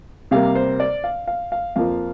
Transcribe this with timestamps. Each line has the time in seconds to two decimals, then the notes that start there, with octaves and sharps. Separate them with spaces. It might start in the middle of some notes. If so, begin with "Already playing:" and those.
0.31 C3 G3 A#3 F5
0.55 C5
0.80 D5
1.04 F5
1.27 F5
1.52 F5
1.76 F2 F3 A#3 F5